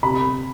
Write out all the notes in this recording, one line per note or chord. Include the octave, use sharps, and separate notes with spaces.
C3 B5